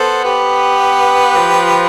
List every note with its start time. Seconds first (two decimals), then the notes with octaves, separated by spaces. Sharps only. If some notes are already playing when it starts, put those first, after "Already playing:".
Already playing: B3 A4 C5
0.25 G4 B4
1.37 F3